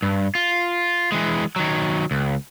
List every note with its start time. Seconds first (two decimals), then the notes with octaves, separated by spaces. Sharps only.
0.02 G2
0.35 F4
1.12 E3 G#3
1.56 D#3 F#3
2.11 C#2